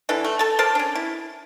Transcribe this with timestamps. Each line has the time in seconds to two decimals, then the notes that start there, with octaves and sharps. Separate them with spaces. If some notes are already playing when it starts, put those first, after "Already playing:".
0.09 D3 E3 D4 A4
0.24 A3
0.39 A4 A5
0.59 A#4 C5 D5 A5
0.75 C#4 D4
0.95 E4